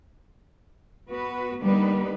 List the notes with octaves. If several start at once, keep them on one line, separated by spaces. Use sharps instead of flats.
B3 F#4 B4
D3 G3 A#3 B3 D#4 B4